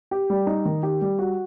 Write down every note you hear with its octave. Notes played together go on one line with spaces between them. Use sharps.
G4
G3
D#4
D#3
G4
G3
F#4